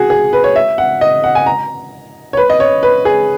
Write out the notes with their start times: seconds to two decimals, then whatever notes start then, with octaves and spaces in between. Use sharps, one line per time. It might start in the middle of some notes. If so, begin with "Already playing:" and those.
Already playing: F#4 G#4
0.10 G#4
0.33 B4
0.44 C#5
0.56 E5
0.78 F#5
1.01 D#5
1.24 F#5
1.35 G#5
1.46 A#5
2.33 C#5
2.37 B4
2.50 D#5
2.60 C#5
2.83 B4
3.05 G#4